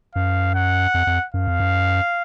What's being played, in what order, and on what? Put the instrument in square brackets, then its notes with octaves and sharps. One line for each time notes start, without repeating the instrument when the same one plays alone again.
[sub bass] F#2 [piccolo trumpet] F5
[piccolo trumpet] F#5
[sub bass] F2
F2
[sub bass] F#2 [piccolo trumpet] F5
[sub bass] F2
F#2